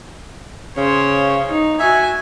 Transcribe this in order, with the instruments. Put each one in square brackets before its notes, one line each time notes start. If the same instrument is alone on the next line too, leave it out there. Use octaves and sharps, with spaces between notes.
[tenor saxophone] C#3 [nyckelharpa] C5 C#5
[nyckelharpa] D#4
[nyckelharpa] F#4 G#5 [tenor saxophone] E5